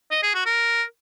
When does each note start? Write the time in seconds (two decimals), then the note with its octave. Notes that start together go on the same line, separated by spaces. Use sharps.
0.11 D#5
0.23 G#4
0.34 F#4
0.46 A#4